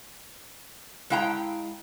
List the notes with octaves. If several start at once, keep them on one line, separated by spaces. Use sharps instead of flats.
G#3 E4 F5 G5 A#5